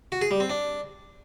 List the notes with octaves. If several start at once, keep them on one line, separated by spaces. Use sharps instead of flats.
F#4
G#4
G3
C4
D4